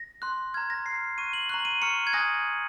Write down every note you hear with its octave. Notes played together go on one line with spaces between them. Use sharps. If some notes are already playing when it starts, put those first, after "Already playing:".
Already playing: A#6
C6 F#6
A#5 F6 G#6
A#6
A#5 F6 C7
A#5 C#6 F#6 D#7
F#7
A#5 C#6 F#6 F#7
D#7
A#5 C#6 F6 C#7
G#6
G#5 D#6 F#6 A#6